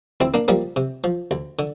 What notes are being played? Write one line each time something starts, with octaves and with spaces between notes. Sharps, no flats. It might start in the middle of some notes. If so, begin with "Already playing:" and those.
D2 C4 E4
A#3 D4
F3 G3 A#3
C3
F3
D2
D3